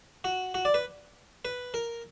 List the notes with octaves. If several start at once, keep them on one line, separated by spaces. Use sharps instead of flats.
F#4
F#4
D5
B4
B4
A#4